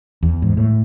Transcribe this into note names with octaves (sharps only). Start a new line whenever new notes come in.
E2
G#2
A2